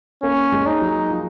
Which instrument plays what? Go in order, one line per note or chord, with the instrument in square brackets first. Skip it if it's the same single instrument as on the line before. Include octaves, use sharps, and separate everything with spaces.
[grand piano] A#3 [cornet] C#4
[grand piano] G#3
[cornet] D#4
[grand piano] F#3
F3